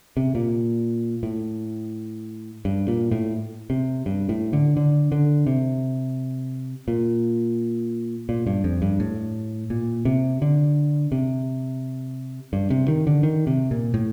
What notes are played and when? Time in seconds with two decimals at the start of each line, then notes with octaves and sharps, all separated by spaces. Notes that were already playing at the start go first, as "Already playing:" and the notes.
0.17 C3
0.35 A#2
1.23 A2
2.65 G2
2.88 A#2
3.11 A2
3.70 C3
4.06 G2
4.29 A2
4.53 D3
4.77 D3
5.12 D3
5.47 C3
6.88 A#2
8.29 A#2
8.47 G2
8.64 F2
8.82 G2
9.00 A2
9.70 A#2
10.05 C3
10.42 D3
11.12 C3
12.53 G2
12.70 C3
12.88 D#3
13.07 D3
13.23 D#3
13.47 C3
13.71 A#2
13.94 A2